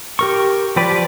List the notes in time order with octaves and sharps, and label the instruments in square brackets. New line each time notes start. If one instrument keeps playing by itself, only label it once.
[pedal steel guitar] G4 A#4 C#6
F3 G4 B4 D5